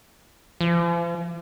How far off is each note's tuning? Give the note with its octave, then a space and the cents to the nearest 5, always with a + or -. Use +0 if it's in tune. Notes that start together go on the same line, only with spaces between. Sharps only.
F3 -40